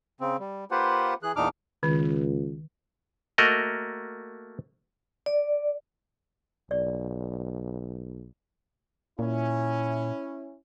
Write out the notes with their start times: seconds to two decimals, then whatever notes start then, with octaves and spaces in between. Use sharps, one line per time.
0.21 C#3 C4
0.40 G3
0.71 A#3 F4 G4 B4 C5 F#5
1.23 E3 G#4 F#6
1.36 E2 A#2 D4 D#4 D6 F6
1.83 C#2 D#3
3.38 A3 A#3 F#4 A#4 D#5
5.26 D5
6.71 B1 D5
9.19 A#2 C#4 E4